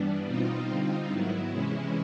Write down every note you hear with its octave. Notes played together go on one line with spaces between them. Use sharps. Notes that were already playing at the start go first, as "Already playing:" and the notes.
Already playing: G2 E3 G3 B3 D4
B2 G3 C4 D#4 F4
D3 G3 C4 D#4
G#2 D#3 F#3 B3 E4
C3 E3 G#3 C#4